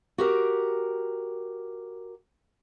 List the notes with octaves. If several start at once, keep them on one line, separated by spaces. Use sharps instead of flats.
F#4 G4 A#4